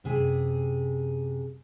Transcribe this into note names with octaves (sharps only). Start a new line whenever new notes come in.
F#2 C3 G#4